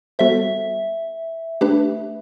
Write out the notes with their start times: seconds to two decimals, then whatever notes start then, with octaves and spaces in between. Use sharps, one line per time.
0.19 G3 B3 F#4 A4 C5 E5
1.61 A3 D4 G4 B4